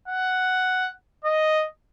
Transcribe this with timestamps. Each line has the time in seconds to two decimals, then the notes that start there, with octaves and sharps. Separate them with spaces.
0.08 F#5
1.25 D#5